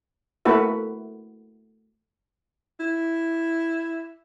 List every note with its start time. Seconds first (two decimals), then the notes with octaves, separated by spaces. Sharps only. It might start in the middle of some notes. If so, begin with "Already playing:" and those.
0.45 A3 A#3 E4 F#4 B4 E5
2.80 E4